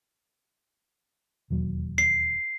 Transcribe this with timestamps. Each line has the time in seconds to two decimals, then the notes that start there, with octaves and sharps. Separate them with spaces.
1.50 E1 D#2 F#3
1.98 C7